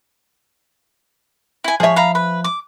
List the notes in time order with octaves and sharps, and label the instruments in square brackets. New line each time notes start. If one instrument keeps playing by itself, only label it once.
[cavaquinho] E4 G#5
[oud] F3 E5 [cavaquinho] G#4 C#5
[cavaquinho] F5 A#5 B5
B4 B5
D6